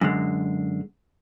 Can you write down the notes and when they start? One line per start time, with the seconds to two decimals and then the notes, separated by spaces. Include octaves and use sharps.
0.01 F#2 D3 G#3